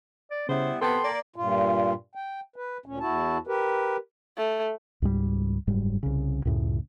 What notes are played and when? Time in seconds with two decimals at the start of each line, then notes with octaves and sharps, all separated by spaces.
0.31 D5
0.49 C#3 G3 B3 E4 C5
0.81 C3 B3 A4 G5 A5 C6
1.02 A#3 D5
1.36 G2 A#2 F4
2.15 G5
2.56 B4
2.86 D2 A#2 C#4
3.00 E2 E4 F#4 A5
3.47 G4 A#4 B4
4.38 A3
5.02 C#2 G#2 G3
5.67 F#1 G#2 G3
6.03 C2 C#3
6.45 C#2 F#2 A2 C#3